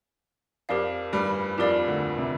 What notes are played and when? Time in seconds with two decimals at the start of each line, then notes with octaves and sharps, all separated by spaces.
0.69 F2 F3 G4 A#4 D5 F5
1.13 G2 G3
1.58 F2 F3 G4 A#4 D5 F5
1.87 D2 D3
2.18 C3